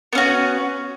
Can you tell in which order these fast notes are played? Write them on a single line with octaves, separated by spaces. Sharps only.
B3 C#4 F#4